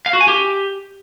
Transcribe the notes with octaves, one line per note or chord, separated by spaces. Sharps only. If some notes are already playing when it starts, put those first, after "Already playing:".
F5
F#4
G#5
G4